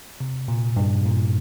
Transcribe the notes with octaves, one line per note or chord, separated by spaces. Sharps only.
C3
A#2
G2
A#2